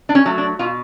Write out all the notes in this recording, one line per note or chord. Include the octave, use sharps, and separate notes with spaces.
D4
C#4
F#3 A3
D4
B2 F4